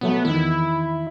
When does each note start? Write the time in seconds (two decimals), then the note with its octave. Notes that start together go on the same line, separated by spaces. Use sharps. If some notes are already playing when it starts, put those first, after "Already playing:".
0.01 B2 F#3 A3 B3
0.25 E2 D#3 E4